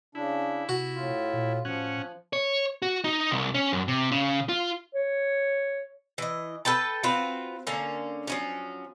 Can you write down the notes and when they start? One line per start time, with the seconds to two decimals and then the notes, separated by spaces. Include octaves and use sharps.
0.15 C#3 D4 E4
0.69 C3 F#4
0.95 A2 F4
1.33 A#2
1.65 A2 F3 C#4 F#5
2.33 C#5
2.82 F#4
3.04 D#4
3.31 C2
3.54 C#4
3.73 F#2
3.88 C3
4.11 C#3
4.49 F4
4.95 C#5
6.18 E3 D#5
6.65 A4 B4 G5 A5
7.03 C4 F4 F#4 B4
7.67 D3 A#3 C#4
8.27 F3 F#3 C#4